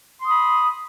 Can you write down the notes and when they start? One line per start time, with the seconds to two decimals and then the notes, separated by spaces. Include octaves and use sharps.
0.22 C6
0.25 D#6
0.29 B5